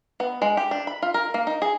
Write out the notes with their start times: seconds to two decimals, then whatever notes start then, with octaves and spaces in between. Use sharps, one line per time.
0.20 B3
0.42 G#3
0.57 G4
0.71 D4
0.87 B5
1.02 F4
1.14 A#4
1.34 A#3
1.47 D#4
1.62 G#4